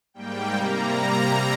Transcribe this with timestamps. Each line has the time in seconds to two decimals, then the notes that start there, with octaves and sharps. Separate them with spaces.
0.14 G#2 G3 A#3 G5
0.54 C3 G3 A#3 A#5
0.95 C3 G3 A#3